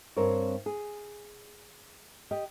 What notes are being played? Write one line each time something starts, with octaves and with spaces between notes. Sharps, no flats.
G2 C4 A#4 C#5
G#4
G4 D#5